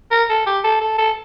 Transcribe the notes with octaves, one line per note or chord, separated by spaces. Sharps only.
A#4
A4
G4
A4
A4
A4